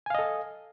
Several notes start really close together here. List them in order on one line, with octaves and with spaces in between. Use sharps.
G#5 F5 D#5 A4